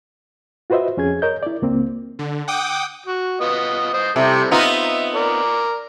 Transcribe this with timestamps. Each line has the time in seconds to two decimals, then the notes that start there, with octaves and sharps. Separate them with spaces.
0.70 F4 F#4 B4 C5 D#5 E5
0.97 F2 C#4 G#4 G#6
1.22 A#4 C#5 D#5 G6
1.43 E4 D5
1.62 C#2 A#3 C4
2.19 D3
2.48 F#5 G5 D6 D#6
3.06 F#4
3.41 B3 F4 D#5
3.94 C5 D#5
4.16 C3 G3 E4 A4
4.51 B3 D#4 F4 E5
5.15 A#4 D5